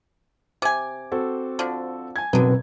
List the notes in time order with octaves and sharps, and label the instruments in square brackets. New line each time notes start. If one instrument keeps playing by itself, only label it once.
[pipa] C3 G#5 [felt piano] D6
[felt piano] C4 F#4 A4
[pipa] D3 F3 D4
[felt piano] G#5 G#6
[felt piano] F#1 F#2 [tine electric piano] B2 C4 B4 [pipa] D3 D#4